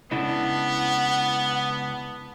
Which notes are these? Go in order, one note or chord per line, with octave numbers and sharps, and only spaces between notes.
C#2 C#3 B3 D4 E4 A4 D#5 F#5